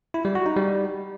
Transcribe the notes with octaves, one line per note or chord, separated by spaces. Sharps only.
E4
G3
F#4
D#4
G3